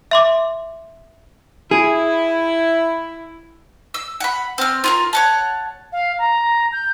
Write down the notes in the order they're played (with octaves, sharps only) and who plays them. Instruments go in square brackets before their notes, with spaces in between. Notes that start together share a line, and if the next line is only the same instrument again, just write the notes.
[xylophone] E5 C6 D6
[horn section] E4 [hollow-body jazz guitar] G#4
[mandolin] E6
F#5 B5
C4 F6
F4 F#4 A#4
C#5 F#5 A5
[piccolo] F5
A#5
G6